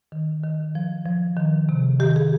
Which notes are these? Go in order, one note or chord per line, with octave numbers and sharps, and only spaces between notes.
D#3
D#3
F3
F3
D#3
C3
D#3 G4
G#4